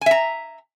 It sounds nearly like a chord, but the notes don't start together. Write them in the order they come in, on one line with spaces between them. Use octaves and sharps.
G#5 E5 A#5